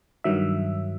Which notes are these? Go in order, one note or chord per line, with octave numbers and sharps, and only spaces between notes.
G2 D#3 F#3 E5